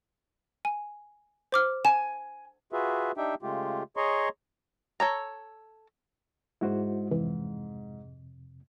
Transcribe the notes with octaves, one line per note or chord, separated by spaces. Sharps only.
G#5
C5 D6 F6
G#5 E7
F4 F#4 G#4 B4 E5
D4 D#4 G4 E5 G5
C#3 G#3 A3 F4 G4
G#4 C#5 D#5 A#5 C6 C#6
A4 C#5 A#5
G#2 E4 F#4 C5
F2 C3 E3